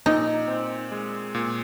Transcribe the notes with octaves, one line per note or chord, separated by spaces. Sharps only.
A#2 D#4
C4
G#3
A#2